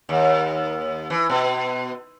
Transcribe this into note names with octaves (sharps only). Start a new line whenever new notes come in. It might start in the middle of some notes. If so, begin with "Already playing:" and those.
D#2
E3
B2